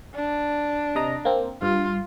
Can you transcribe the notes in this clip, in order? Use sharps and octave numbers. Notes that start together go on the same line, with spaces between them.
D4
C3 D#5 A#5
A#3 C4
G2 F4